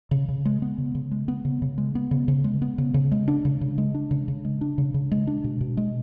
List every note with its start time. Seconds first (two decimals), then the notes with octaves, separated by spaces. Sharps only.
0.11 C#3
0.29 C#3
0.45 G#3
0.62 B3
0.78 C#3
0.95 C#3
1.12 G#3
1.28 B3
1.45 C#3
1.62 C#3
1.78 G#3
1.95 B3
2.11 C#3
2.28 C#3
2.44 G#3
2.62 B3
2.78 C#3
2.94 C#3
3.12 G#3
3.28 D4
3.45 C#3
3.61 C#3
3.78 G#3
3.94 D4
4.11 C#3
4.28 C#3
4.45 G#3
4.61 D4
4.78 C#3
4.94 C#3
5.12 G#3
5.27 D4
5.44 B2
5.61 B2
5.77 G#3